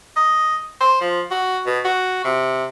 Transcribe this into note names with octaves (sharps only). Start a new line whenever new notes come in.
D#5
C5
F3
F#4
B2
F#4
C3